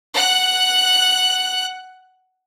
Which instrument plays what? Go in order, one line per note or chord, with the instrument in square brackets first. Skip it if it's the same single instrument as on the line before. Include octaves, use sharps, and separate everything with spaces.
[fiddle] F#5 F#6